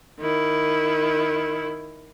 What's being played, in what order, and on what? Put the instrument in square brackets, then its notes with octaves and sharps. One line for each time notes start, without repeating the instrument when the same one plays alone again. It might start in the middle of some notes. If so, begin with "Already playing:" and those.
[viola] D#3 E4